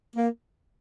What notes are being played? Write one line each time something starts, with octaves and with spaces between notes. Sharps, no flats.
A#3